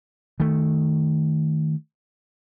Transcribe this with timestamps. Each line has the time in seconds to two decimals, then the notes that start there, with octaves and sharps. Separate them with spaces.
0.40 D#3 A3